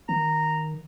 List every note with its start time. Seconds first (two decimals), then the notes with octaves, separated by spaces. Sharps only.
0.09 D#3 A#5